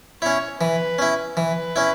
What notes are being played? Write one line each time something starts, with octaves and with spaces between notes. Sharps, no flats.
C#4 E4 C#5
E3 B4
C#4 E4
E3 B4
C#4 E4